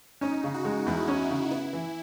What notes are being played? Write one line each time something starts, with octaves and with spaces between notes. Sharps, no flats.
C#4 D#4
C#3
F#4
G#3
E2 E4
C#4
C#3
B3 E4
E3